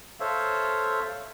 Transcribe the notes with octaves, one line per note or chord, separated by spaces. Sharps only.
A4 C5 C#5 E5 F5